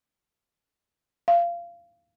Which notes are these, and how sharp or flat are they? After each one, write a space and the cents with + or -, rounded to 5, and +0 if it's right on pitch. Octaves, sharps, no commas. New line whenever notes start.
F5 -20